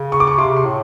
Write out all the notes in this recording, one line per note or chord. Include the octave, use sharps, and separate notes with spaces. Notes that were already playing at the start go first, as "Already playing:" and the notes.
Already playing: C#3
C#6
D6
C#6
C3 C6
C6
A2